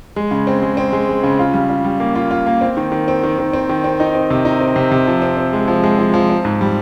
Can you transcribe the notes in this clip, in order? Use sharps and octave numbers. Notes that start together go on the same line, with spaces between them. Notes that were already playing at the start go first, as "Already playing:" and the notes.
G#3
C#3
C4
G#3
C4
G#3
G#3
C#3
F4
G3
F4
G3
A#3
F4
F4
A#3
C4
D#3
D#3
C4
D#3
D#3
C4
D#3
C4
D#4
C4
C3
D#4
C4
C3
C3
F3
C4
C4
G#3
F3
G#3
F3
F3
C4
G#2
G3